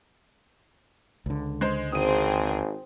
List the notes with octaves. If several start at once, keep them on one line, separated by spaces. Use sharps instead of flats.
C#2 D3
G#3 C5
G#1 C4 G#4 D#6 D#7